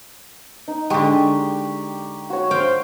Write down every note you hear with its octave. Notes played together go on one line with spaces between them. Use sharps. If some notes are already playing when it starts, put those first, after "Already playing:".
D#4
D3 G#3 G4 G5 C#6
F#4 C#5
C5 F5 G5